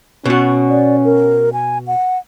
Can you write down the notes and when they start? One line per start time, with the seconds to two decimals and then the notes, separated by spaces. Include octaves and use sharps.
0.25 B2 C#4 F#4
0.70 D5
1.05 A#4
1.53 G#5
1.87 F#5